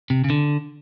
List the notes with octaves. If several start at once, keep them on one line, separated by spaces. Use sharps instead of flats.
C3
C#3
D3